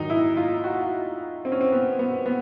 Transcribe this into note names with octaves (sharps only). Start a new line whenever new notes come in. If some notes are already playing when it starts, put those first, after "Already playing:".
Already playing: G#2 D#3 F#3 D#4
E4
F4
F#4
C4
C#4
C4
B3
B3
B3